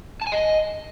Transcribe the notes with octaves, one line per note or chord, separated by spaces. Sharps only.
A5
G#5
D#5